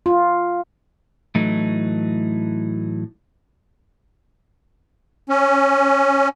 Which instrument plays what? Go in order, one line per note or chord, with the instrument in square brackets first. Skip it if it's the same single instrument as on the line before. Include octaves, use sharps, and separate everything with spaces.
[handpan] F4
[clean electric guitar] A2 E3 F#3 A3 D#4
[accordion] C#4